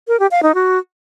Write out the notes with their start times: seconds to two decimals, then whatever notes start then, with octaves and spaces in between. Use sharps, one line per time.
0.08 A#4
0.19 G4
0.31 F5
0.43 D#4
0.54 F#4